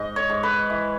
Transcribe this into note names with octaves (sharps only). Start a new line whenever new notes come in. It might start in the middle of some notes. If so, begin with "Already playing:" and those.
Already playing: G#2 D#5
C#5
G#2
B4
E3